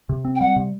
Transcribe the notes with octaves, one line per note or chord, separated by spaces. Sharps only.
C3
C4
G5
G3 F#5
C3